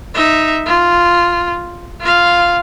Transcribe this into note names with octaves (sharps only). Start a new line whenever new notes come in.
D#4 E5
F4
F4 F5